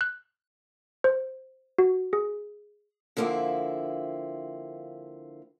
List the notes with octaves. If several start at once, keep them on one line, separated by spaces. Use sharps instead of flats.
F#6
C5
F#4
G#4
D3 F3 A#3 C4 E4